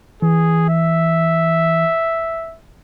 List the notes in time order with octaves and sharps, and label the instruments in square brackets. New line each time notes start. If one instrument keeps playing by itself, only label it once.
[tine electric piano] E3 [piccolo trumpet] G#4
[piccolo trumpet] E5